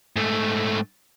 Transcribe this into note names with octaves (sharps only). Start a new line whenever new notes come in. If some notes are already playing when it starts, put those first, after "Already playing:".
G#2 A3